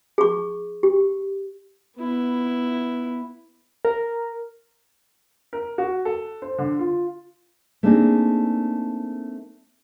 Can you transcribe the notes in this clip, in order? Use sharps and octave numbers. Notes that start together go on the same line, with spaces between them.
G#4 C#6
G4
B3 E4
A#4
A#4
F#4
A4
C5
D3
F4
A3 A#3 C4 D4 D#4 G#4